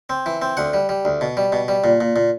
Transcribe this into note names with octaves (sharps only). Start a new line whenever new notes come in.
C4
E3
C4
D2 F#5
G3
G3
D2
B2
G3
B2
G3
A#2
A#2
A#2